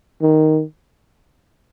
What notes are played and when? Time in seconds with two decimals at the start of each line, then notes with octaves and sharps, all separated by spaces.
0.22 D#3